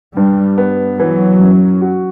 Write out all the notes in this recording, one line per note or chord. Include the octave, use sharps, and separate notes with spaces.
G2 G3
B3
E3 F#3
F#2
F#4